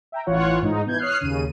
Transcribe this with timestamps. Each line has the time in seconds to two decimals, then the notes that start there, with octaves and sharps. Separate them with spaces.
0.12 E5 G5 A#5
0.26 A1 E3 F4 C#5 F#5
0.62 G#2 D#4
0.86 B2 E3 G6 G#6
0.98 C#5 D#6 F6 F#6 C7
1.20 D#2 C#3 D#7